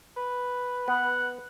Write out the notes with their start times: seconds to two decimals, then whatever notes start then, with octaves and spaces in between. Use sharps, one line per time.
0.17 B4
0.88 B3 F#5